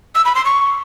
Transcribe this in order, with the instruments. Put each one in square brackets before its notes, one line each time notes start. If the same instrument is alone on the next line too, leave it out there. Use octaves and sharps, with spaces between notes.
[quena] E6
B5
C6
C#6